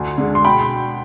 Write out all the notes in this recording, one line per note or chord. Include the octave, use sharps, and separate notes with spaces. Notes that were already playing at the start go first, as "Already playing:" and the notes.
Already playing: D2 G#5 C6
D3 G#3
C6
B2 G5 B5